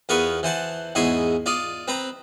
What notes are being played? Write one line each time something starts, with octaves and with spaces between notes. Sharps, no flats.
E2 F4 A#4 B4 C#6 D#6
E3 C5 F#5 A5
E2 G#2 E4 D#5 C6 C#6
F4 D5 D#5
C4 B4 A#5